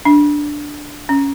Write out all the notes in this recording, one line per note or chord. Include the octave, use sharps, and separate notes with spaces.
D4
C#4